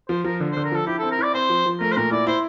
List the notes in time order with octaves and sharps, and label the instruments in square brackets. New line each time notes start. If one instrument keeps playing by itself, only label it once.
[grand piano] F3 [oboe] C5
[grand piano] F3 [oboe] A#4
[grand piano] D3
[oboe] C5
[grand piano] D3
[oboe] A#4
[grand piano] F3 [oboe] A4
[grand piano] E4 [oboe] G4
[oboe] A4
[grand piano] C4
[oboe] A#4
[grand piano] E4 [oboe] D5
[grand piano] C4 [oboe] C5
[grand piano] F3
F3
[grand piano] A3 [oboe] A#4
[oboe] C5
[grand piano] A#2 [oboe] A#4
[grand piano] E4 [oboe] D5
[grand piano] E4 [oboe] C5